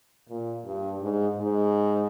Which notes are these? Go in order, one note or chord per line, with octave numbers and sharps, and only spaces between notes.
A#2
G2
G#2
G#2